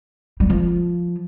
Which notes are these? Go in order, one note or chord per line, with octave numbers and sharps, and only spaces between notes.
G3
F3